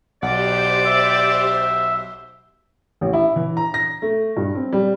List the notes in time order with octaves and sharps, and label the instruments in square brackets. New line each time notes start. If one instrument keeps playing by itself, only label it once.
[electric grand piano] B1 F#5 [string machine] G4 C5 [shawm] D5
[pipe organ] E5
[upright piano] A1
E4
E3
A#5
A#6
A3
G2
C4
G3